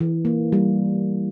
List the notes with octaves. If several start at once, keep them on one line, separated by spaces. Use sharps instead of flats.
E3
A#3
G3